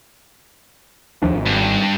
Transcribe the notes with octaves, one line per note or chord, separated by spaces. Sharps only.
D#2 F3 D4
G#1
G2